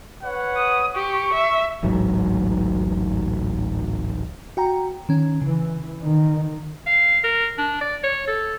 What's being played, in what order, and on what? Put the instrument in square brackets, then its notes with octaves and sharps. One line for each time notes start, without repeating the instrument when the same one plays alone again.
[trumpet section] B4 C#5 F#5
[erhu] D#6
[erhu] G4 [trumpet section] C#6
[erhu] E5
[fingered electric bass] D1 A1 G#2 F#3
[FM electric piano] F#4 G5 A#5
D#3 C#4
[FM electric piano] C#3 [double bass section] E3
[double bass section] D#3
[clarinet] F5
A#4
D4
D5
C#5
A4